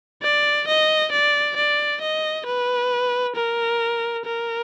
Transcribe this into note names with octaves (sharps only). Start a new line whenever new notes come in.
D5
D#5
D5
D5
D#5
B4
A#4
A#4